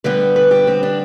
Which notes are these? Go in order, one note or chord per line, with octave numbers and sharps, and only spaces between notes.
D3 G3 B3 B4
B4
G4
C4
D4